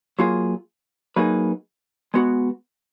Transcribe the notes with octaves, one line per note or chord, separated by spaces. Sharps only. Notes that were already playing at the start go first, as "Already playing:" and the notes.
F#3 A#3 F4 G#4
F#3 A#3 D#4 G#4 B4
G#3 B3 F#4